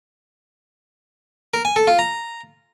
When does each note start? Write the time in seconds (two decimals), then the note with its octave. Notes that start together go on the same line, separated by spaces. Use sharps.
1.54 A#4
1.65 G#5
1.76 A4
1.87 F4
1.99 A#5